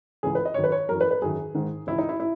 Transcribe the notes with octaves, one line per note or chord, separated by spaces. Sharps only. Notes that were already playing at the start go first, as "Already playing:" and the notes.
C#2 C#3 E3 G#4
B4
D#5
F#2 D#3 C#5
B4
C#5
F#2 E3 A#4
B4
B4
F#2 D#3 G#4
G#2 D#3
C#2 C#3 E3 E4
D#4
E4
E4